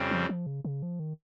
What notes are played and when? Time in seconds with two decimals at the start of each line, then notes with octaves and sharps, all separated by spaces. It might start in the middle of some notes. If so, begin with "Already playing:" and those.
Already playing: F2 C#3 G3 C4
0.11 F3
0.29 F3
0.47 C#3
0.65 C#3
0.83 F3
1.00 D#3